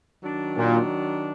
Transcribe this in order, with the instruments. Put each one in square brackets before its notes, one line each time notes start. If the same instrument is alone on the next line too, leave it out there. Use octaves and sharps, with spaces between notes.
[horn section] D#3 F#3 D4
[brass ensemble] A#2